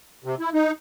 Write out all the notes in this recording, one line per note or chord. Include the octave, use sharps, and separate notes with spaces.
C3
E4
D#4